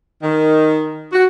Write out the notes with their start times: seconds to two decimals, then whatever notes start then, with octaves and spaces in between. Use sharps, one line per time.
0.22 D#3
1.12 F#4